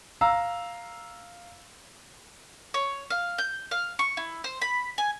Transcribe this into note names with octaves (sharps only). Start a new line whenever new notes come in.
F5 A#5 E6
C#5
F5
G6
F5
C#6
E4
C5
B5
G#5